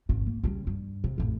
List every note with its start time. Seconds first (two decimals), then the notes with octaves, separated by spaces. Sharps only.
0.09 G#1 C#3
0.26 A#3
0.44 C#3 G3
0.67 G2
1.04 C3
1.18 A1 F2